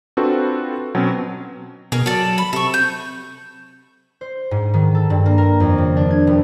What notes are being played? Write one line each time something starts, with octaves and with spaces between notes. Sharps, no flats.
C4 D4 F4 F#4 A4 B4
B2 F#3 C4 C#4
B2 G#4 A#4
F#3 A4 D5
B5
C3 A4 C#6
G6
C5
G#2
D#3
A4
G2
A#3
A#4
F2
C#3
D4
G#6
F1